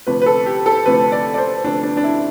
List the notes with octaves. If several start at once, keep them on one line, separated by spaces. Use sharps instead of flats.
D2 C3 F3 A3 B4
B4
A4
G4
A4
D2 C3 F3 A3 B4
D5
D5
C5
D2 C3 F3 A3 D4
D4
D4
E4